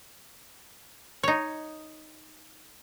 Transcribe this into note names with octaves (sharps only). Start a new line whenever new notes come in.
D#4 C#5